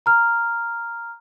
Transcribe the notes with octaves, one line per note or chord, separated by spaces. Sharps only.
A#5 F6